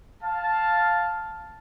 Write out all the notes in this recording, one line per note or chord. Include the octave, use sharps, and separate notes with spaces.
F5 A5